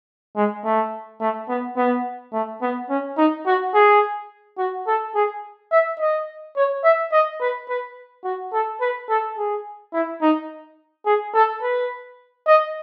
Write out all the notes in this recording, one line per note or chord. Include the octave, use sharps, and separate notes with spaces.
G#3
A3
A3
B3
B3
A3
B3
C#4
D#4
F#4
G#4
F#4
A4
G#4
E5
D#5
C#5
E5
D#5
B4
B4
F#4
A4
B4
A4
G#4
E4
D#4
G#4
A4
B4
D#5